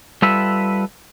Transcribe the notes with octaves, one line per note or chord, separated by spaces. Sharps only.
G3 F4 A4 B4 E5